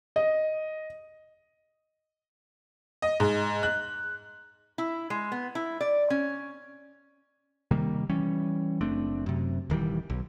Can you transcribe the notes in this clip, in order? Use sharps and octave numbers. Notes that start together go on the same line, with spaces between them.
D#5
D#5
G#2
F#6
E4
G#3
B3
E4
D5
C#4
C3 D#3 G3 A#3
E3 G3 C#4
F#1 A3 C4 D4
F#2 C3
D#1 D#3 E3 G3
B1